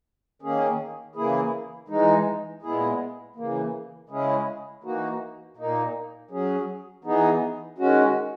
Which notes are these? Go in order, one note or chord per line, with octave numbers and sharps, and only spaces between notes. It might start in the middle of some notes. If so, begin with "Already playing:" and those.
D#3 A#3 C#4 G#4
C#3 E3 A#3 E4 G#4
E3 G#3 D#4
A#2 G#3 B3 E4 G#4
C#3 E3 A#3
C#3 G#3 C#4 E4 G#4
E3 A#3 D#4 F#4
A#2 A#3 D#4
F#3 C#4 G#4
E3 B3 D#4 G#4
D#3 G#3 C#4 F#4